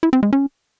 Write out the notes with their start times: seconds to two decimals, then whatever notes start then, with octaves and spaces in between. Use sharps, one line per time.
0.03 E4
0.13 C4
0.23 G#3
0.33 C#4